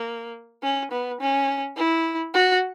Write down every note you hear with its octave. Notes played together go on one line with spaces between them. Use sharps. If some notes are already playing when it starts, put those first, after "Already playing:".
Already playing: A#3
C#4
B3
C#4
E4
F#4